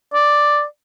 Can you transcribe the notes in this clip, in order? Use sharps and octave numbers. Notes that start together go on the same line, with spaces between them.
D5